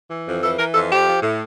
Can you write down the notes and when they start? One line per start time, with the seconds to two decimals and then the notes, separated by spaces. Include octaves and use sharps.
0.09 E3
0.26 F2
0.42 E3 A4
0.58 E3 A#4
0.74 F2 A4
0.90 F3 G4
1.07 F3
1.23 A2